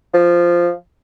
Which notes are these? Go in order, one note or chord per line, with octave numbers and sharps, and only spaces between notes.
F3